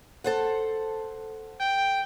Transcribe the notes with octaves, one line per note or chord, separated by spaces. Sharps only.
A4 C5 F#5
G5